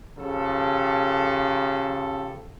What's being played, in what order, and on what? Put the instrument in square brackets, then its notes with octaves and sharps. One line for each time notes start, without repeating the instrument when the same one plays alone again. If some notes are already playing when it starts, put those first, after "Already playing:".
[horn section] C#3 F3 G4 A4